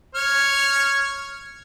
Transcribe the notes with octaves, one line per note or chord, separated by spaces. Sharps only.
C#5 F6